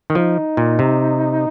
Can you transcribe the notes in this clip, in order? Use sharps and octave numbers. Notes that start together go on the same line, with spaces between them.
D#3
F3 D#4
A#2
C3